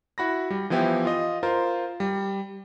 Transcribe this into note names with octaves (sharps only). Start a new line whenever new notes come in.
E4 F#4 B5 A#6
G3
E3 F3 B3 E4 G4
F4 D#5
F4 A#4 C5
G3